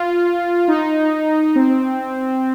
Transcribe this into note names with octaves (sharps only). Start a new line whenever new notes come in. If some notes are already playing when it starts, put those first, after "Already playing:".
Already playing: F4
D#4
C4